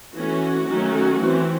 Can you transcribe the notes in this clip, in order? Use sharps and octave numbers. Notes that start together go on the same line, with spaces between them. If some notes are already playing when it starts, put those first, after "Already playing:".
E3 A3 C#4 F#4
D#3 F#3 A3 C#4
E3 C4